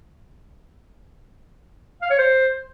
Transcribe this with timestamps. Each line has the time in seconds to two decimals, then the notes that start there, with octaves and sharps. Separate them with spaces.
2.02 F5
2.10 C#5
2.18 C5